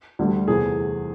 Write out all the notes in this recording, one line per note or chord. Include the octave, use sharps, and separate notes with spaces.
D2 D3 G3
E2 C3 E3 A3 G#4